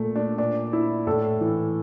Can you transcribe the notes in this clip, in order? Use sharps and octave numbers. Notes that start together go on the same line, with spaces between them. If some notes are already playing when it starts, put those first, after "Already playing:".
Already playing: A#2 A3
D4
A#2 D4
E4
A2 A4
E3